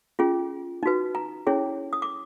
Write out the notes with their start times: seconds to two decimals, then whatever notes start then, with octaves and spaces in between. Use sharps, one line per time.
0.19 C#4 F4 G#4
0.83 D#4 F#4 B4
1.15 A#5
1.47 C#4 E4 G#4 C#5
1.93 D#6
2.02 D6